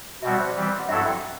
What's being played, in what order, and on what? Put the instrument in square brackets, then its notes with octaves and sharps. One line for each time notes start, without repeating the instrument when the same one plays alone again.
[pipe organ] B2 G3 C4 F#4 [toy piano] E5
[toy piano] D5
C5
D5
[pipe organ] E3 G3 C4
[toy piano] F#5
[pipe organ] G2 F#3 C4 E4 A4 [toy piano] E5
[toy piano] G5